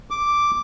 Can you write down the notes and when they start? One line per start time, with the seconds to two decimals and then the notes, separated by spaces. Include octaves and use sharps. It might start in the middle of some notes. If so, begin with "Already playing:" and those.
0.11 D6